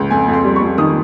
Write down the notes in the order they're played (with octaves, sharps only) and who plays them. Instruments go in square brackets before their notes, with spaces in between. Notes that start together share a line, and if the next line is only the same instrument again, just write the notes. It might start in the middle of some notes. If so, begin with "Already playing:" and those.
Already playing: [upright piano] C#2
F2 G#5
F2
C6
G3
C#6
F2
D#3 D#6